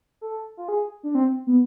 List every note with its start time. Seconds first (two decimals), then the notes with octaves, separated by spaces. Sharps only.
0.21 A4
0.57 F4
0.68 G#4
1.03 D4
1.15 C4
1.47 B3